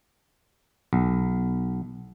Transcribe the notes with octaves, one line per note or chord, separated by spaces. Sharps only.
B1